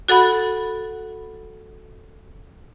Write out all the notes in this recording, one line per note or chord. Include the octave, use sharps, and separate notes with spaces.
F#4 A4 F#5 B5